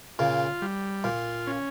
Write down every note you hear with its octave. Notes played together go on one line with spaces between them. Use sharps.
A#2 C#3 F4
G3
A#2 F4
C#4